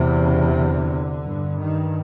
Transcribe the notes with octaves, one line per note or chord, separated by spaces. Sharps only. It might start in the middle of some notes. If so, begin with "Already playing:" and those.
Already playing: E2 C3
C#3
D3
G2
D#3